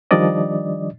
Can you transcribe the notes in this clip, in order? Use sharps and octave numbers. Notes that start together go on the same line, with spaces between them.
D#3 F3 G3 D4 D5 D#5